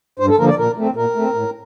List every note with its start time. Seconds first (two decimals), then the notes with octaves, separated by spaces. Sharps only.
0.19 G2 C5
0.29 A4
0.38 D3 F3 A#3 A#4
0.48 D5
0.58 A#2 A#4
0.77 A3 C4
0.96 A#2 A#4
1.15 A3 C4
1.34 A2